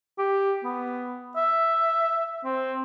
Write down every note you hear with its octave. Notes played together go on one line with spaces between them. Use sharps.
G4
B3
E5
C4